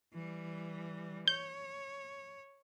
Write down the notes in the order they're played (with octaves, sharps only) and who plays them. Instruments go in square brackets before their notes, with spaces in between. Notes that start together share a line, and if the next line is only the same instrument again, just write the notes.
[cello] E3 G3
[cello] C#5 [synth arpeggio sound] G6